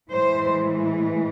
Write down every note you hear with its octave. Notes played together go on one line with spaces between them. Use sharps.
A2 E3 G#3 C5